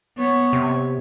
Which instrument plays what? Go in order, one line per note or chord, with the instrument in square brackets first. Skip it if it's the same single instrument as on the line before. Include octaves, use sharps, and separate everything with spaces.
[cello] B3 C#5
[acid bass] C3